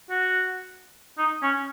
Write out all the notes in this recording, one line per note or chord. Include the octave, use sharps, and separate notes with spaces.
F#4
D#4
C#4